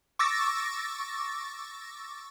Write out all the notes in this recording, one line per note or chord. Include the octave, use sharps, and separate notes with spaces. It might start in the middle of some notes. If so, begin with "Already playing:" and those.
C#6 D6 E6 A6 A#6